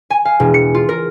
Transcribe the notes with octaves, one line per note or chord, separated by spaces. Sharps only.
G#5
F5
E1
C#7
F4
A#4